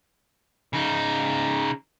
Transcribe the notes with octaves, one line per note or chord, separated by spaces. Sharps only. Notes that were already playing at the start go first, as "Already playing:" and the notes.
C#3 D#4